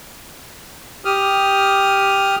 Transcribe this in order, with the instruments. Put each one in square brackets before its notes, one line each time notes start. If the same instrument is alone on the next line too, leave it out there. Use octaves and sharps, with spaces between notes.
[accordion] G4 D#6 F6